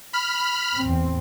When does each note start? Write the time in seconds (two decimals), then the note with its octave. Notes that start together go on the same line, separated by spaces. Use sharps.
0.13 B5 F6
0.79 E2 A2 C4